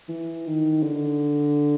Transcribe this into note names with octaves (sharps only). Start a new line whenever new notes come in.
E3
D#3
D3